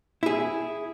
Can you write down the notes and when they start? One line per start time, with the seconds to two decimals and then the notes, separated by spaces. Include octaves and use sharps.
0.23 E4 G#4